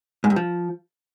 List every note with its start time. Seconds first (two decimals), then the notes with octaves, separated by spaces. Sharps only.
0.24 G#2
0.30 G2
0.36 F3